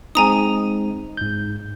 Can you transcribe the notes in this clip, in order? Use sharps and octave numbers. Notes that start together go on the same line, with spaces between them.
G#3 C4 D#4 G#5 A#5 D#6
G#2 G6